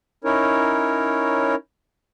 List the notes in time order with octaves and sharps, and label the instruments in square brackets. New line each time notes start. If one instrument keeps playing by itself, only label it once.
[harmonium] C#4 D#4 E4 A#4 C#5